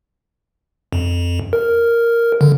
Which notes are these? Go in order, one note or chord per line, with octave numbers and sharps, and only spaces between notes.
F2
A#4
D3